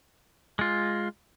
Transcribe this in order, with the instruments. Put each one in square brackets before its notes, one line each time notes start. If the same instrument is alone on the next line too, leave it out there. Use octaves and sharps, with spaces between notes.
[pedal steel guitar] G#3 F4